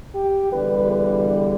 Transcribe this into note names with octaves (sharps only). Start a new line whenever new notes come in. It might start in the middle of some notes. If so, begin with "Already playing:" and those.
G4
E2 D3 G3 B4
B4